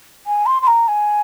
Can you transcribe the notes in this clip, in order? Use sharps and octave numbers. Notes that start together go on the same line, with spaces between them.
G#5
C6
C6
A#5
G#5